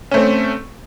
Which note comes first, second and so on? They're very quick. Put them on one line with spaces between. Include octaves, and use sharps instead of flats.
C#4 A3 C4